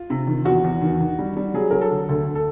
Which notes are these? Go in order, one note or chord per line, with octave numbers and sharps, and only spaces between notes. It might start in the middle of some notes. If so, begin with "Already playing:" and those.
Already playing: F4
C3
D#3
E2 F#4
E2
D#3
D#3
G3
G3
F#3 G#4
F#3 A#4
A4
D3
D2 A4
D2
A4